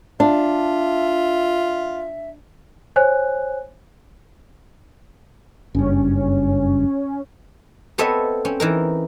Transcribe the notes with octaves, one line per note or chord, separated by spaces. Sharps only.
D4 F4 E5
C5 C#5 G#5 F#6
F#1 G2 C#4
B3 C4 A4 C#5 D#5 E5
C4 C#4
E3 D#4 A#4